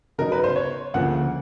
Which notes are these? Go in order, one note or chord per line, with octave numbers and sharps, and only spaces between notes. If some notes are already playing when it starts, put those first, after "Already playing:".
C#3 F#3 B3 D#4 A#4
B4
C5
C#5
D2 C#3 F3 A#3 F#5